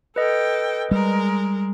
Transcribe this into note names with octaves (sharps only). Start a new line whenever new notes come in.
A4 B4 D#5 G5
G3 G#3 A#4